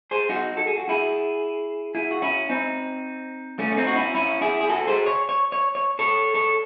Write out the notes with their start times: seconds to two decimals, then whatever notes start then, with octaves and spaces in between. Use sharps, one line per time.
0.11 G#4 C5
0.29 D#4 F#4
0.57 A4
0.67 G#4
0.78 F#4
0.89 E4 G#4
1.95 E4 G#4
2.11 F#4
2.22 C#4 E4
2.50 C4 D#4
3.59 A3 C#4
3.72 C#4
3.77 C4 D#4
3.87 F#4
3.95 C#4 E4
4.15 C#4 E4
4.41 E4 G#4
4.61 G#4
4.69 F#4 A4
4.87 G#4 C5
5.06 C#5
5.29 C#5
5.52 C#5
5.75 C#5
5.99 A4 C#5
6.34 A4 C#5